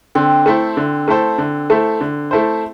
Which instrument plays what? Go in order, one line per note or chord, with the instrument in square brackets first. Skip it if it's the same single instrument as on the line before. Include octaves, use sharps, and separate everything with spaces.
[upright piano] D3 [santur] C4
[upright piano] A3 E4 A4 C5
D3
A3 E4 A4 C5
D3
A3 E4 A4 C5
D3
A3 E4 A4 C5